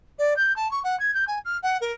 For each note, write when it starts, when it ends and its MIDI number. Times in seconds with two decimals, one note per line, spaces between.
0.19 0.36 74
0.36 0.55 91
0.56 0.70 81
0.71 0.80 85
0.84 0.98 78
1.00 1.14 92
1.14 1.25 91
1.28 1.39 80
1.45 1.57 89
1.63 1.78 78
1.81 1.92 70